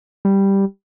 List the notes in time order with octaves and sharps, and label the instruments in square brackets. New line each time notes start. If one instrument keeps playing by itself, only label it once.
[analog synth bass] G3